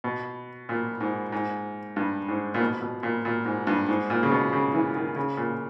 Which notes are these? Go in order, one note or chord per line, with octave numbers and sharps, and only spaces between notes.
B2
A#2
G#2
G#2
G2
G#2
A#2
B2
B2
A#2
A#2
G#2
G2
G#2
A#2
C#3
B2
C#3
E3
D#3
C#3
A#2